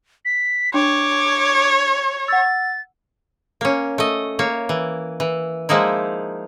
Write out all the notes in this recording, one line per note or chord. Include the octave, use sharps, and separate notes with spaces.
B6
D4 C#5 D6
F#5 E6 A6
A#3 C#4
A3 D#5
A#3 C#5
E3
E3
F3 G#3 A#3 D#4 E4